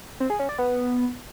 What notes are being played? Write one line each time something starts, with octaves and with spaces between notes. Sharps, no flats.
C4
G#4
C#4
D5
B3